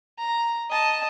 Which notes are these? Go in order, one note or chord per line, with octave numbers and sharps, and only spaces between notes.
A#5
D#5 A5